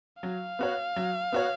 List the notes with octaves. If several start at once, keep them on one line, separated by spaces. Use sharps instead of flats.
F#3 F5
B3 F#4 C#5
F#3
B3 F#4 C#5